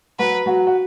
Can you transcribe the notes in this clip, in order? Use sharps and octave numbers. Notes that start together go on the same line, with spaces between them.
F#3 F#4 B4
F#3 F#4
F#4